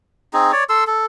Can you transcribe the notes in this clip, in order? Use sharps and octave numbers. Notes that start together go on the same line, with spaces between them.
C4 D#4 G#4
C#5 D5
A4 C6 E6
A4